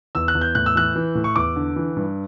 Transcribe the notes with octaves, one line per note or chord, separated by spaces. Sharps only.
E2 E6
F#6
E2
G6
A2 F#6
E6
E3 F#6
E3
A2
C#6
E2 D6
D3
E3
G2